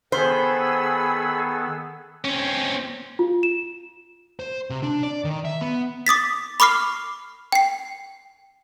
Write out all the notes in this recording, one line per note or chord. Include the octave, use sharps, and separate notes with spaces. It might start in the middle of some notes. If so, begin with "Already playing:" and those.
D#3 B3 G#4 A4 C5 B5 E6
C4 C#4
F4
E7
C5
C3
D4
D5
D#3
E5
B3
D6 D#6 A6 B6
B5 C#6 D6 F6 C7
G5 C7